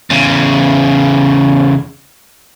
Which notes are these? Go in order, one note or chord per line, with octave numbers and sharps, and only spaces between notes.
E2 C#3